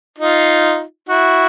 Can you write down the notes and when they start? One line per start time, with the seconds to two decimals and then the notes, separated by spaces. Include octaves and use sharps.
0.19 D#4 F4
1.09 E4 F#4